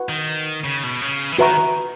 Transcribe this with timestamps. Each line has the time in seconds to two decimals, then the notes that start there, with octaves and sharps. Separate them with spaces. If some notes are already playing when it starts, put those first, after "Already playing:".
Already playing: F#4 B4 F#5 C#6
0.09 D#3
0.64 C#3
0.83 B2
1.01 C#3
1.32 E3
1.38 D#3 F#4 B4 E5 A#5 C#6